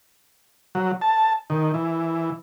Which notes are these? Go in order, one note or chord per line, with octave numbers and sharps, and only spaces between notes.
F#3
A5
D#3
E3